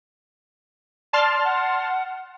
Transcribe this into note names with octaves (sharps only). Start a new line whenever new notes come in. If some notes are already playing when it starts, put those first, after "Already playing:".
D5 A5 C6 F6
F#5